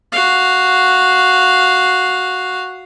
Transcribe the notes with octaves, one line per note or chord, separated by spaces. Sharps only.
F#4 F5